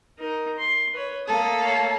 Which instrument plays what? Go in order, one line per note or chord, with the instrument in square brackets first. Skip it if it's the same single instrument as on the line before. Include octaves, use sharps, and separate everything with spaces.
[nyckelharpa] D#4 A#4
C6
B4 C#5
[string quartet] A3 A#3 A4 [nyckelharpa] D#6
[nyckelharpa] C#5 F5